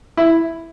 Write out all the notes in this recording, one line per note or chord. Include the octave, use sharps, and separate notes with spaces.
E4